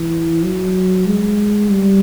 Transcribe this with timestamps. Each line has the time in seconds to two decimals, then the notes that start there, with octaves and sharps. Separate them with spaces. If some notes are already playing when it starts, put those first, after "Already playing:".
Already playing: E3
0.44 F#3
1.07 G#3
1.70 G3